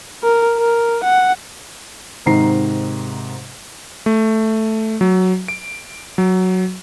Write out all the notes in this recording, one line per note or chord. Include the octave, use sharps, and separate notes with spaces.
A#4
A#4
F#5
G#2 C3 D#3 A#5 C7
A3
F#3
D7
F#3